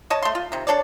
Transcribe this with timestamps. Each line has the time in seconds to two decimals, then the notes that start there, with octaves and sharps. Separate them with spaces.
0.10 C#5 D#5 A5
0.22 A3 C6
0.35 F4
0.52 C3 D#3
0.67 D4 A4 C#5 D5